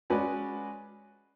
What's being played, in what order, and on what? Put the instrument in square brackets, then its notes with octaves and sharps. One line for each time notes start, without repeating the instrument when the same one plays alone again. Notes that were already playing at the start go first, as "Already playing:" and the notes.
[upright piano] G#3 C#4 F#4 B4 D5